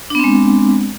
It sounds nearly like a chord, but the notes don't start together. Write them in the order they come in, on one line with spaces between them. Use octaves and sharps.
D4 B3 C4 G#3